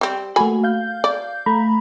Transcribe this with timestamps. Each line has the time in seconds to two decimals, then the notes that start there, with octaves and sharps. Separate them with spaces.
0.01 G3 C4
0.36 A3 A#3 F#4 G#5 B5
0.64 F5 G6
1.04 D5
1.46 A3 A#5 B5